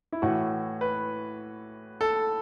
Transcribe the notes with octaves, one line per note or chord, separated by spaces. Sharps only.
E4
A2 E3 F#4
B4
A4